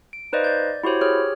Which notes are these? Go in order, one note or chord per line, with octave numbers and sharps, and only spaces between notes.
D7
D#4 B4 C5 D5 D#5 F5
D5 G6
E4 F#4 G4 C5 C#5
G4 G#4 C#5 F6